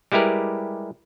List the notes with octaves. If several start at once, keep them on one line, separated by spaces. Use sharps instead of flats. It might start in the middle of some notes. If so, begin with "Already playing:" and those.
G3 G#3 E4 G4 A#4 B4